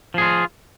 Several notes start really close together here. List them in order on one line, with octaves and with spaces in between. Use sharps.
F3 G#4 F4